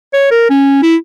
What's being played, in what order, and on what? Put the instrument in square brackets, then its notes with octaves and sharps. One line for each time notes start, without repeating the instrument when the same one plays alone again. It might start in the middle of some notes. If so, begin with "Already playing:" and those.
[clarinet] C#5
A#4
C#4
E4